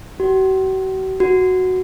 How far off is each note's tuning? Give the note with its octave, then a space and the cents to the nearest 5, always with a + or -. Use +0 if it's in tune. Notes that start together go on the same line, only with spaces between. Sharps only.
F#4 +45
F#4 +0